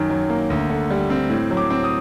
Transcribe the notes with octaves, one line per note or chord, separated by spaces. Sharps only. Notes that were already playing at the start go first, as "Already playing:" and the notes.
Already playing: F#2 D#3
F#3
A#3
D2
D3
G3
C4
A2
F#3
D6
C4
D#6